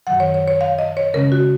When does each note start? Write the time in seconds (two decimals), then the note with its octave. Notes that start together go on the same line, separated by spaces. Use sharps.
0.07 F#2 D#3 F#3 F#5
0.20 C#5
0.34 C#5
0.48 C#5
0.61 F5
0.79 D#5
0.97 C#5
1.14 C#3 G#3 C#4 A#4
1.32 F#4